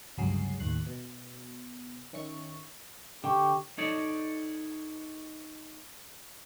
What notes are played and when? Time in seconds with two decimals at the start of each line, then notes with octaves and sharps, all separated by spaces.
0.17 G1 C#2 G2 F#3 G#4 C7
0.60 A1 D#2 F#6 C7
0.87 B2
2.13 D#3 C#4 E5 C#6 C#7
3.24 D3 G4 G5 C#6
3.78 D#4 A4 C#5 D5